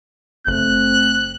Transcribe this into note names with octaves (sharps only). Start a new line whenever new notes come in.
F#1 A3 C4 F#6